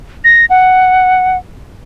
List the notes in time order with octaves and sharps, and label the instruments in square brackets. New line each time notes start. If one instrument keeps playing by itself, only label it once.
[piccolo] A#6
F#5